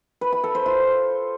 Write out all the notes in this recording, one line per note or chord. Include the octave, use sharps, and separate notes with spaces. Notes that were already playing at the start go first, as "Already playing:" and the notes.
B4
B5
A4
C5
F4